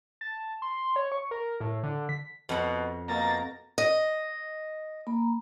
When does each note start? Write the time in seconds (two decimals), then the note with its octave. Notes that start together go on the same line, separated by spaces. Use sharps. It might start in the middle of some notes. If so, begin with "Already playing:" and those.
0.21 A5
0.62 C6
0.96 C#5
1.12 C#6
1.31 A#4
1.60 A2
1.83 D3
2.09 B6
2.49 F2 B2 F#5
3.08 B2 A#3 A#5 A6
3.78 D#5
5.07 A#3 A#5 B5